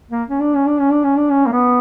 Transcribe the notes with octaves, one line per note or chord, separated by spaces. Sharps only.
A#3
C#4
D4
C#4
D4
C#4
D4
C#4
D4
C#4
A#3
B3